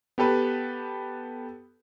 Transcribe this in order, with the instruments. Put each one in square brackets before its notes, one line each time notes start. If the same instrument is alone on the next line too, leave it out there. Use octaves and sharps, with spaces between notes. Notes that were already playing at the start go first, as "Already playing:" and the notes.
[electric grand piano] B3 G4 A4 B4